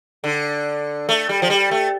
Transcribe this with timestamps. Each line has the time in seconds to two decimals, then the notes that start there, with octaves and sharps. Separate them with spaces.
0.24 D3
1.09 A3
1.29 G3
1.42 F3
1.50 G3
1.71 A3